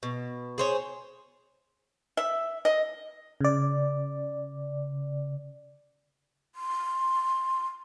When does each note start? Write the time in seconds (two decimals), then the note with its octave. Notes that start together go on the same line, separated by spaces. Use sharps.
0.03 B2
0.58 G#4 C5 C#5
2.17 E5
2.65 D#5
3.41 C#3 D5
6.55 C6